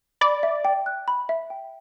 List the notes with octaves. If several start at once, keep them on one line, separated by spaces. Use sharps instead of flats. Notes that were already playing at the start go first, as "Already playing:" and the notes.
D5 B5
E5
G5
F#6
B5
E5
G5